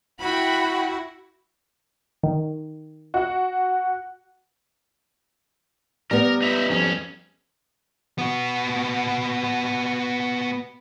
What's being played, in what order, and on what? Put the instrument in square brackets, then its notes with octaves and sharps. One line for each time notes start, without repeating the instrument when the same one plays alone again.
[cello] E4 F#4 [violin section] F#5 G5 B5
[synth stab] D#3
[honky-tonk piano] F#4 F#5
[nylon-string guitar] G3 B3 [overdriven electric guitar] A#4
[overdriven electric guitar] D#4 E5
F2 C#4
[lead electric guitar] B3 F#4